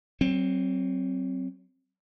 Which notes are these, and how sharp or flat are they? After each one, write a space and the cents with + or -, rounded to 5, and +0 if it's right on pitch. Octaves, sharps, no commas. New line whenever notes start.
F#3 +35 C4 +15